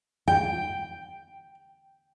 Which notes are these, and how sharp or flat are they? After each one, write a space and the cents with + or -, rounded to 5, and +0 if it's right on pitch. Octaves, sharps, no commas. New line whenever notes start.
G5 +0